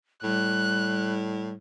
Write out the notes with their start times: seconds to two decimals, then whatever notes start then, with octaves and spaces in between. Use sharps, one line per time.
0.23 A2 G3 F#6